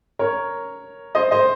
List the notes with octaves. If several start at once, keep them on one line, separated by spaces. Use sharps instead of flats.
A#4 C#5
C5 D#5
C5 D#5